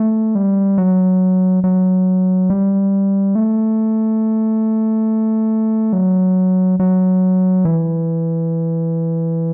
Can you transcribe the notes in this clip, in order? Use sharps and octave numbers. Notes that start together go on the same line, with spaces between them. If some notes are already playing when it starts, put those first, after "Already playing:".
Already playing: A3
G3
F#3
F#3
G3
A3
F#3
F#3
E3